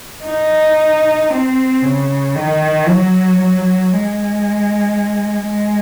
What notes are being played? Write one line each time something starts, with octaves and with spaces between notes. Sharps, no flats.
D#4
C4
C#3
D#3
F#3
F#3
G#3
G#3